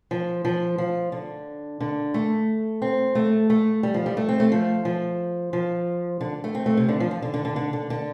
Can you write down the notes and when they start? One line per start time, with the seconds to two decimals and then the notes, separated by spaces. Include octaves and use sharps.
0.11 F3
0.45 F3
0.78 F3
1.12 D3
1.80 D3
2.14 A3
2.82 C4
3.15 A3
3.50 A3
3.83 G3
3.94 F3
4.06 G3
4.17 A3
4.29 C4
4.40 A3
4.52 F3
4.85 F3
5.53 F3
6.21 D3
6.44 A3
6.55 C4
6.66 A3
6.77 C3
6.89 D3
7.00 F3
7.11 F3
7.22 D3
7.34 D3
7.45 D3
7.56 D3
7.73 D3
7.90 D3